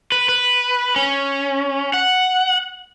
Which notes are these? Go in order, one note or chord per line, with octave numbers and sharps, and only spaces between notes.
B4
B4
C#4
F#5